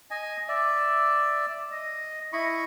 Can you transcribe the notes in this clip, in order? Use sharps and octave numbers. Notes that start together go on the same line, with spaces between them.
D#5 G#5
D5 E5
D#5
E4 D#5 B5 C#6